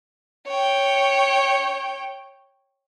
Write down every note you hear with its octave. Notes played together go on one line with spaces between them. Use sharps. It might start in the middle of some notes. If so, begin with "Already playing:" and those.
C#5 G5